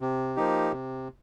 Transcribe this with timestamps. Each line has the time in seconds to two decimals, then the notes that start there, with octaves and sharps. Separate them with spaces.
0.01 C3
0.36 F3 A#3 D#4 G4
0.72 C3